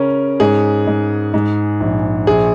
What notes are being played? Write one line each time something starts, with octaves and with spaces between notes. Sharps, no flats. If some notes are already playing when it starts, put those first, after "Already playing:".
Already playing: C#3 C#4 A#4
G#2 G#4
G#2
G#2
A#1
A#1 G#4